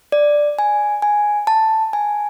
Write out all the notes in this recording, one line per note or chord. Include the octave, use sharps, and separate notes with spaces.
D5
G#5
G#5
A5
G#5